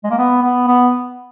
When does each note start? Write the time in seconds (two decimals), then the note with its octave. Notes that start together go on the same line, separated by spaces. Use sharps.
0.04 G#3
0.11 A#3
0.18 B3
0.43 B3
0.68 B3